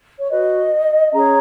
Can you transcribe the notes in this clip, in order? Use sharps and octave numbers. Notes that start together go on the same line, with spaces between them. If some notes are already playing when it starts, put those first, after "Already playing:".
C#5
F#4 B4 D#5
C#4 G#4 C#5 A#5